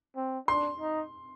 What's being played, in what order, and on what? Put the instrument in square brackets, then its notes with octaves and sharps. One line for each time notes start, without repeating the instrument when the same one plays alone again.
[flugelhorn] C4
[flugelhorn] D4 [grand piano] C6
[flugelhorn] D#4